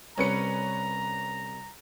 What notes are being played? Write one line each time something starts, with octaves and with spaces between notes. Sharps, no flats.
C2 C#4 B4 A#5 C#7